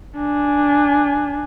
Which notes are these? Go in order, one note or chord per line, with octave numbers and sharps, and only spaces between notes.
D4 G#5